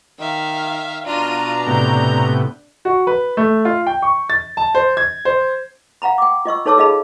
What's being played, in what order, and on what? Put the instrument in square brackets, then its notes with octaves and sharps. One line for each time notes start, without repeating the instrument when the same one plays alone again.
[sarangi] D#3 [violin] E5 F5
[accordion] B2 A#5 [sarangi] D4 [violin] F4 D#7
[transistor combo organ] A2 C3 B3 [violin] G6
[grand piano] F#4
B4
A3
F4
G5
C#6
A6
A5
C5
G#6
C5
[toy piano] F5 F#5 A#5 B5
G5 D6
F4 D#5 C#6 E6
D#4 A4 C#5 A5 D6 E6
F4 G#4 D#5 F5 A5 B5